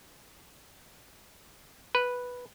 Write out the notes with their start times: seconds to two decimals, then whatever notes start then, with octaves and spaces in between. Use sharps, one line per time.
1.95 B4